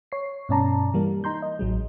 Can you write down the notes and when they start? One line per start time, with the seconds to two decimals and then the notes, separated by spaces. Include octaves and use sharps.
0.12 C#5 C7
0.49 G2 B2 C#4 D5 A5 A#5
0.94 E3 G3 A#3 A#4
1.24 D#4 A#5 C6 G6
1.42 D#5
1.59 A1 F#3 G#3